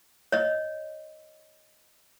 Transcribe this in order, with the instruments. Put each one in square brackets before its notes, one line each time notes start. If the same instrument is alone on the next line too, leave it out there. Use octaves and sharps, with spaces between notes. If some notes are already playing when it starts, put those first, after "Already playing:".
[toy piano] C#5 D#5